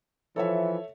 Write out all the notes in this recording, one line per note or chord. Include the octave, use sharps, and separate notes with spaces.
E3 F3 A4 C#5 E5